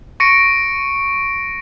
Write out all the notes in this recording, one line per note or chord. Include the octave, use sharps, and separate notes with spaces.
C#6 A#6 C#7 D7